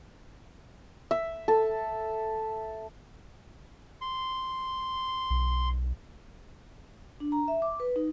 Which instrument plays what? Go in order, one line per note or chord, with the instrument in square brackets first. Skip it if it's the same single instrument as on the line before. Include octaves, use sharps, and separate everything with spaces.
[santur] E5
A4
[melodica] C6
[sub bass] B1
[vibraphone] D4
A#5
E5
D6
B4
D#4